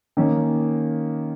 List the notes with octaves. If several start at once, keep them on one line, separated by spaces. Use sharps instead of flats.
D#3 A#3 C#4